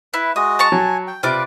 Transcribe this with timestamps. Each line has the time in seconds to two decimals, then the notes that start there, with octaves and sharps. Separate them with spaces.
0.14 E4 B4
0.36 G#3 F#4 D#5 D#6
0.59 A5 A#5 C#6
0.72 F#3 G#5
1.08 G5
1.23 C3 F4 B4 D5 D6